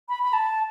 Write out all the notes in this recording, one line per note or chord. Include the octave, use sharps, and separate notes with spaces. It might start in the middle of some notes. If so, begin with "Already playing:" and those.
B5
B5
A5